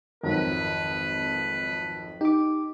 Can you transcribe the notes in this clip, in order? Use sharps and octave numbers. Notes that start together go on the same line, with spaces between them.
G#1 F2 D#3 F#3 B4
D#4 G4 D6